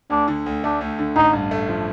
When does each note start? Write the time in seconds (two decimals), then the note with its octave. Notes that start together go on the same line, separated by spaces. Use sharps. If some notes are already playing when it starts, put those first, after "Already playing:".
0.10 D2 D4
0.28 D3
0.46 D2
0.64 A3 D4
0.81 D2
0.99 D3
1.16 A1 D#4
1.33 G2
1.51 A3
1.69 F3